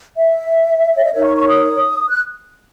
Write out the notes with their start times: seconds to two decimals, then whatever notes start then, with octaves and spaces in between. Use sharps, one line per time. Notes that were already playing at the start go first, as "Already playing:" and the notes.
0.17 E5
0.96 C#5
1.04 D#5
1.13 D#4 A#4 C#5 E5
1.25 C#6
1.36 C#6
1.48 D#6
2.08 F#6